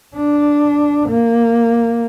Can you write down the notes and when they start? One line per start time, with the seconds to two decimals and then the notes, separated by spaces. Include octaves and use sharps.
0.16 D4
1.09 A#3